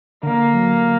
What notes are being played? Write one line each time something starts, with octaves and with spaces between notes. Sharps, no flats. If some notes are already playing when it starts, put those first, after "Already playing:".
D3 A#3
F#3